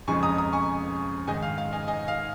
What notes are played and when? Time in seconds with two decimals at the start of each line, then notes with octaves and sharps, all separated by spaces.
0.07 F2 C#3 F3 G#3 G#5 C#6
0.23 A#5 D#6
0.38 A#5 D#6
0.53 G#5 C#6
1.27 G#2 D#3 G#3 D#5 G#5
1.42 F5
1.58 F5
1.73 D#5 G#5
1.88 D#5 G#5
2.08 F5